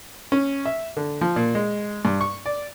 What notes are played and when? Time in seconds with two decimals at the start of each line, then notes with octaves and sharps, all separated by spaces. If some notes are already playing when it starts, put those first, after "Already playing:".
0.32 C#4
0.66 E5
0.97 D3
1.21 F3
1.36 A#2
1.55 G#3
2.05 G2
2.21 C#6
2.46 D5